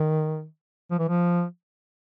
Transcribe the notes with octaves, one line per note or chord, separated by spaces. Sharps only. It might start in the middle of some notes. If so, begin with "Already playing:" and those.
Already playing: D#3
F3
E3
F3